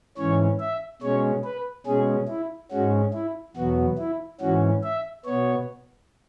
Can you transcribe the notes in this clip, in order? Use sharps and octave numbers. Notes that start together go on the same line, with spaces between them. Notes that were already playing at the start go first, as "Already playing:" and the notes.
G#2 E3 C#4 C#5
E5
B2 G#3 C#4 C#5
B4
B2 G#3 C#4 G#4
E4
G#2 G#3 C#4 F#4
E4
E2 B2 F#3 B3 F#4
E4
G#2 E3 C#4 F#4
E5
B2 B3 C#5